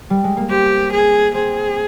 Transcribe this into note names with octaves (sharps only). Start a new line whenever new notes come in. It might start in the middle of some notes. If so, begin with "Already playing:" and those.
G3
G#3
A#3
C4 G4
G#4
C4 G#4